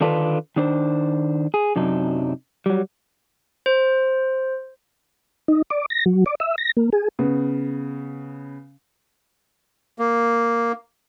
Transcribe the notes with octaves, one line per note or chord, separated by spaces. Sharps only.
D3 D#3 D4 F4 A4 B4
D#3 D4 C5
G#4
F#2 C3 F#3 D4 D#4
F#3 G3
C5
D#4
D5
A#6
F#3
D5
E5
A#6
A#3
G#4
C#3 B3
A#3